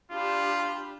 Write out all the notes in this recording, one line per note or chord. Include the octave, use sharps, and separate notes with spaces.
D4 F4 G4 B5